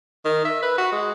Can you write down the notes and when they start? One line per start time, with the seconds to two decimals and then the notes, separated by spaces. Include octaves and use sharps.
0.25 D#3
0.45 E5
0.62 B4
0.78 F#4
0.92 G#3